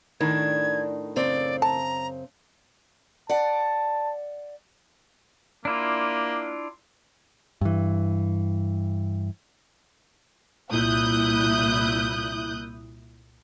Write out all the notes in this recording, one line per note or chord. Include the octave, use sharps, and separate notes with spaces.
A2 D#3 D4 G#6
F#2 C#3 C4 D5
A5 A#5
D5 F#5 A5
A#3 D4 E4 F4
G2 E3
C2 A#2 E4 D#6 F#6 G6